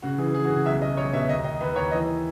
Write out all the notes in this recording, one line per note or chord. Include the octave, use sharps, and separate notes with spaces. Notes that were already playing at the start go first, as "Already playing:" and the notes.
C#3 F#4
E3 G#4
E3 G#4
F#4
C#3
B1 E5
B1 D#5
B1 C#5
B2 E5
D#2 D#5
D#2 D#5
D#2 B4
D#2 C#5
E3 D#5